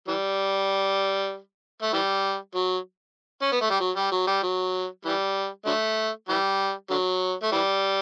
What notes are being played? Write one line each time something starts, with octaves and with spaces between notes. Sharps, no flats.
E3 G3
A3
E3 G3
F#3
C#4
B3
A3
G3
F#3
G3
F#3
G3
F#3
E3 G3
D3 F#3 A3
E3 G3
D3 F#3
A3
E3 G3